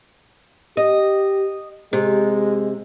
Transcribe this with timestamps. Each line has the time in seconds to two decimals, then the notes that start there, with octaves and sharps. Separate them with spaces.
0.77 G4 D#5
1.93 C3 G#3